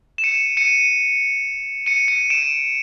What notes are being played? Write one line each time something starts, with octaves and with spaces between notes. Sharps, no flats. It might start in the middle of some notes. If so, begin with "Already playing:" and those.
E7
C#7 D#7
C#7 D#7
C#7 D#7
C#7 D#7
D7 E7